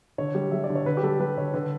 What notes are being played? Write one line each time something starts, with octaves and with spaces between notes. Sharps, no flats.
D3 C#5
G3
G3 E5
D5
D3
C#5
D3 B4
G4
G3 A4
G3 B4
D3 C#5
D3 B4